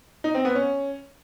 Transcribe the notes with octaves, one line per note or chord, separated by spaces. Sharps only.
D#4
C4
B3
C#4